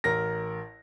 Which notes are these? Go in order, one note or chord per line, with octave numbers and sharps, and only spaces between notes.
A1 A#4 A#6